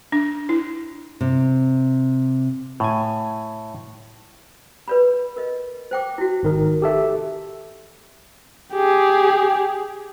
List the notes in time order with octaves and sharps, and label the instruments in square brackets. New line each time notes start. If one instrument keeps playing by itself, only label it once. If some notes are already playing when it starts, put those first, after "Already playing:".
[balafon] D4
E4
[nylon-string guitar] C3
[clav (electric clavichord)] A2 G#5
[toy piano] B4 D5 B5
A#4 D#5
C5 G5 D6
E4 F#4
[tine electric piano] G#1 D#3 A#4
G4 A4 E5
[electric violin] G4 G#4